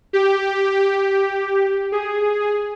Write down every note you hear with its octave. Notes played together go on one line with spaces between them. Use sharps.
G4
G#4